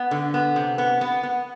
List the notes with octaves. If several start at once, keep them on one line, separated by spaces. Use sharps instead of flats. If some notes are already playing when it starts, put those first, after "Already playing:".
Already playing: B3
D3
B3
C3
B3
B3
B3